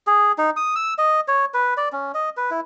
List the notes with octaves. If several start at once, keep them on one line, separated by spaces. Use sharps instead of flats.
G#4
D#4
D#6
E6
D#5
C#5
B4
D5
C#4
D#5
B4
E4